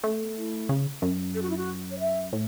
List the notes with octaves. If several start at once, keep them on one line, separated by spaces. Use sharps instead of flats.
A3 C#4
B3
E4
C#3
F#2
A4
F#4
E4
F#4
C#5
E5
A2